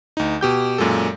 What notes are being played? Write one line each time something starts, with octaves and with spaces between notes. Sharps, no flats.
D2 D#4
B2 G4 G6
F#2 A#2 G#3 A4